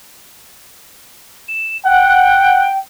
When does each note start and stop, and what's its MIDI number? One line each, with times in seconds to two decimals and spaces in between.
1.48 1.77 100
1.85 2.66 78
1.85 2.78 79